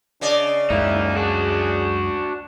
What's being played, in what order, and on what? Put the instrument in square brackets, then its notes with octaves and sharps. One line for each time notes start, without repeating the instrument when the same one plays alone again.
[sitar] C#3 D5 D#5 [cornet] D4
[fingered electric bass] C#2 F#2 G#3 [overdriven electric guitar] A#3 D#4 [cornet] E4
[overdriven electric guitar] D4 F#4 [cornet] G#4